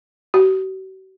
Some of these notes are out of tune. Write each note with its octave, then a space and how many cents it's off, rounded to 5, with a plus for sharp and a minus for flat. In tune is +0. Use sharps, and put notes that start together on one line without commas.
F#4 +45